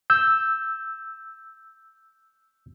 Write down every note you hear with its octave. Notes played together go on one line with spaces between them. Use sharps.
E6 G6